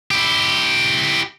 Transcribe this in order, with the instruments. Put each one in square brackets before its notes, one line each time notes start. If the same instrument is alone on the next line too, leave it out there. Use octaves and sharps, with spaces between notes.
[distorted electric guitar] E4 G4